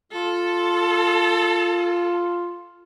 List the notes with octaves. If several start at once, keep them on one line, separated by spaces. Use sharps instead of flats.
F4 A4